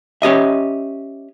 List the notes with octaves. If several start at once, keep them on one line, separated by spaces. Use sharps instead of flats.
C#4 G4 D#5 E5